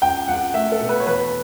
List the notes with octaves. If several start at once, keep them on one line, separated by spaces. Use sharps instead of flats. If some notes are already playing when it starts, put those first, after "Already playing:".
C#2 G5
C#2 F#5
A3 E5
A4
B2
B4
C#5
E2 B4